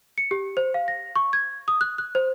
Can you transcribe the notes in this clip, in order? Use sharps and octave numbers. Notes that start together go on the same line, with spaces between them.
C#7
G4
C5
F5
A#6
C#6
G#6
D#6
F#6
F#6
C5